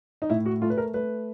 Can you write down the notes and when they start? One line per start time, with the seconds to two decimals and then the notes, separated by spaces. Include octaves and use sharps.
0.22 D#4
0.29 A2 E4
0.46 F#4
0.62 A3 F4
0.70 B4
0.78 A#4
0.94 A3 B4